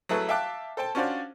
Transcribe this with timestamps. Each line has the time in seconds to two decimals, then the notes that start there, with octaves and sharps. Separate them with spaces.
0.09 F#3 A3 E4 G#4 A4 B4
0.29 E5 F5 G5 A5 D6 F#6
0.77 A4 C5 G5 A5
0.95 C#4 D4 F4 F#4 C5 D5